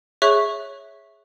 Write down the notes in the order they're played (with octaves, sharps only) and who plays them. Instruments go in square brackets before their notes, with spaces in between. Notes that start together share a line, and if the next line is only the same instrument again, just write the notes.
[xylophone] G#4 C#5 E5 C#6 F#6